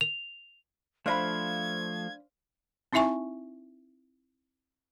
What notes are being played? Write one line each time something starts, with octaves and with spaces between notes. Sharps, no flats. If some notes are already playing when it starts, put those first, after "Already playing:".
F7
F3 A3 D4 C5 D#5 F5 B5 G#6
C4 D#4 E4 E5 G#5 C#6